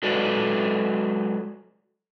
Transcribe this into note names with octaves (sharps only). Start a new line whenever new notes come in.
F#3 G#3 F#4 A4 B4 D5